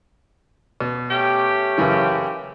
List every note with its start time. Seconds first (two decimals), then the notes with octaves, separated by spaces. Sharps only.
0.81 B2
1.09 A3 C#4 G4
1.78 F#2 C#3 E3